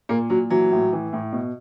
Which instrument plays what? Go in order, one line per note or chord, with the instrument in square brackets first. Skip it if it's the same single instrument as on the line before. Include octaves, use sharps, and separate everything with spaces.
[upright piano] A#2 A#3
A#2 F#3
E3 F#3
A2
E3
A2
B2